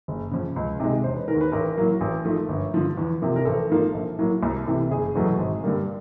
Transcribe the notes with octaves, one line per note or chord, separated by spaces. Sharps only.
F#1
F2 C#3
C#2
C3 D#3 G#3
E1 C5
B4
D#2 D#3 A#4
B4
A1 A#4
A2 F#3 A#3
A1
G#2 F3 A3
G1
G2 D3 F3
E2
C3 F3 A#3
A#4
A1 A4
G#2 F3 A#3
A#1
A2 F#3 A#3
C2
C3 E3 A3
F#1 G#4
E2 B2 F#3 A3
G#1
G2 D3 G3 A#3